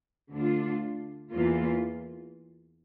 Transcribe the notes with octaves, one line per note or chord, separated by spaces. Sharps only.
D2 D3 A3 D4 F4
E2 E3 A#3 F4